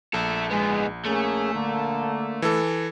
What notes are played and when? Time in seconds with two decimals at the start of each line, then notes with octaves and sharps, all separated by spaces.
0.14 A#1 A4 E5
0.50 G#2 G#3 B3
1.05 A3 A#3 C#4 G#4
1.54 D3 A#3
2.42 E3 A4